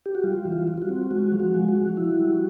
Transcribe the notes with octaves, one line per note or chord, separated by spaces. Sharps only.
G4
F#4
G3 F4
E3
F4
G3
F4
F#4
C4
G#3 F#4
F3
F#4
G#3
F#4
F3
E4
G3